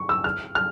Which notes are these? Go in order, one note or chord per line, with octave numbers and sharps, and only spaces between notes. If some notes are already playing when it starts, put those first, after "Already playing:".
Already playing: C#6
E6
F6
F6